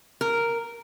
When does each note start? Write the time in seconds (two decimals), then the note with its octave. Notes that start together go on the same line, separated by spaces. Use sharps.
0.21 A#4